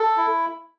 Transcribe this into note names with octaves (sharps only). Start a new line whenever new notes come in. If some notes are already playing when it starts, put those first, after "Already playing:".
Already playing: A4
E4